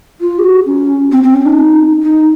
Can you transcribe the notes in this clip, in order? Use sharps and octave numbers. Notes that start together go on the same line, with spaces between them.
F4
G#4
F#4
C#4
C4
C4
C#4
D#4
D#4